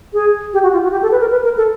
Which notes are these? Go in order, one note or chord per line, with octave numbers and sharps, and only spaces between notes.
G#4
G4
F#4
F4
F#4
G4
A4
B4
A#4
B4
A#4
A4